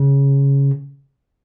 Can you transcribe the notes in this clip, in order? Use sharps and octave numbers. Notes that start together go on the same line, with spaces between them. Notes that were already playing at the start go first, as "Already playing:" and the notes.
Already playing: C#3